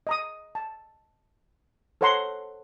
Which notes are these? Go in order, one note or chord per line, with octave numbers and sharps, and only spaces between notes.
D#5 A#5 D#6
A5
A4 C5 C#5 F#5 A#5 C6